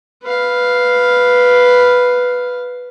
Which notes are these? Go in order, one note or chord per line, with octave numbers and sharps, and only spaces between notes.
B4 F5